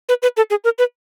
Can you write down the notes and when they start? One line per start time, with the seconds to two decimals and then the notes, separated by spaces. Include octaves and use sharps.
0.09 B4
0.23 B4
0.37 A4
0.50 G#4
0.64 A#4
0.78 B4